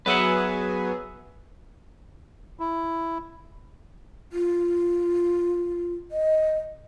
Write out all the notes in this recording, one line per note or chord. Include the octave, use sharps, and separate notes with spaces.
F#3 B3 G#4 B4 E5 F#5
E4
F4
D#5